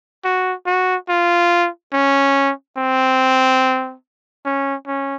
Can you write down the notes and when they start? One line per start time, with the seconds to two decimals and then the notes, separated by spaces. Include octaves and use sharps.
0.25 F#4
0.67 F#4
1.10 F4
1.93 C#4
2.78 C4
4.46 C#4
4.88 C#4